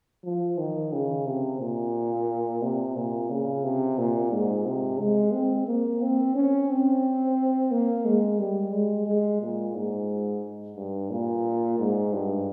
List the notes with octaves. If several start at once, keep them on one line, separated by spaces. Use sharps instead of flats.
F3
D#3
C#3
C3
A#2
C3
A#2
C#3
C3
A#2
G#2
C3
G#3
C4
A#3
C4
C#4
C4
A#3
G#3
G3
G#3
G#3
A#2
G#2
G2
A#2
G#2
G2